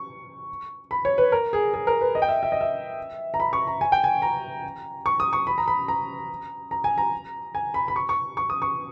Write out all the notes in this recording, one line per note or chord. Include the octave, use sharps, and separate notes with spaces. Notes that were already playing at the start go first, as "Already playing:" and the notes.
Already playing: C#6
B5
C#5
B4
A#4
G#4
G#4
A#4
B4
D#5
G5
E5
E5
D#5
E5
A#5
B5
C#6
A#5
G#5
G5
G#5
A#5
C#6
D#6
C#6
B5
A#5
B5
A#5
A#5
G#5
A#5
G#5
B5
B5
C#6
C#6
C#6
D#6
C#6